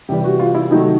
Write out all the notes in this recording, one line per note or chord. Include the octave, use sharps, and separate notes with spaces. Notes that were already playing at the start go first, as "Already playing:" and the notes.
C3 E3 G3 G4
F#4
F4
E4
C3 D#3 F#3 A3 D#4